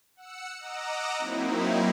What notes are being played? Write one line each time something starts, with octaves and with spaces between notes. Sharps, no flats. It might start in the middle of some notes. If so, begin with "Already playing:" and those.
F#5 E6 C#7
D#5 F#5 A#5 D6 E6
F#3 A#3 C4 D#4 E4